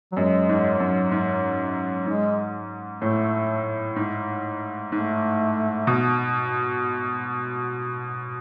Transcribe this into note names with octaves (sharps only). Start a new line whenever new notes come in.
F#3
F#2 G#3
G#2
F#2
G#2
G#2 G#3
A2 A3
G#2
G#2 A3
B2